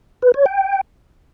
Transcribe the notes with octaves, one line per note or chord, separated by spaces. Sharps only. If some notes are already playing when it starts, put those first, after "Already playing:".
B4
C#5
G5